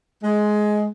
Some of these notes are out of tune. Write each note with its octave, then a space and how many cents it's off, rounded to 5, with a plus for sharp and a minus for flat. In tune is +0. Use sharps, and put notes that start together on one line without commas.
G#3 +15